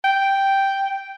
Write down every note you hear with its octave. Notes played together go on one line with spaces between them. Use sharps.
G5